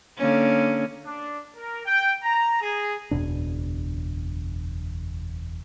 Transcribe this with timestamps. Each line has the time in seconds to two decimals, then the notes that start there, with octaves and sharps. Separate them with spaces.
0.18 D3 A#3 C#4
1.04 D4
1.56 A#4
1.85 G5
2.23 A#5
2.62 G#4
3.11 F#1 E2 B2 D4